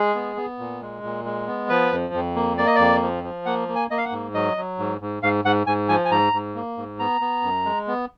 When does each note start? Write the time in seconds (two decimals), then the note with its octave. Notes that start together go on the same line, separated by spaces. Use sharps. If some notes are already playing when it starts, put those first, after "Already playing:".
Already playing: G#3 G#4
0.15 B3
0.36 B3
0.59 A#2
0.81 G#3
1.03 A#2
1.25 G#3
1.47 B3
1.69 F3 B4
1.92 F2
2.14 F2
2.35 A#3
2.58 A#3 D5
2.67 D#5
2.75 F2 D5
3.02 F3
3.24 F3
3.46 A#3 F#5
3.68 A#3
3.75 G#5
3.90 A#3 D#5
3.98 F5
4.05 F#5
4.12 G#2
4.34 F#3 D#5
4.57 F#3
4.79 G#2
5.01 G#2
5.23 G#2 F5
5.45 G#2 F#5
5.67 G#2 G#5
5.89 F3 G#5
6.05 G#5
6.11 G#2 A#5
6.33 G#2
6.55 A#3
6.77 G#2
6.99 B3 A#5
7.21 B3
7.43 F#2
7.65 G#3
7.88 B3